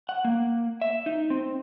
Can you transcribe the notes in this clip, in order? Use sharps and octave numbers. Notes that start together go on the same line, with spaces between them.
F#5
A#3
E5
D#4
C4